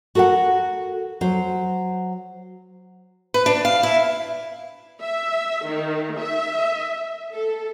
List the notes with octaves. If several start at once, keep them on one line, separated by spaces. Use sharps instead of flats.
F#4 A4 A#4 D#5 F#5
F#3 C5
B4
D4
F5
E4
E5
D#3
E5
A4